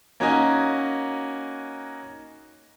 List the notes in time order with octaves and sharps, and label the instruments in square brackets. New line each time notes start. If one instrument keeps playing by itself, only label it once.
[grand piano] A#3 C#4 D#4 F#4 D#5 G#5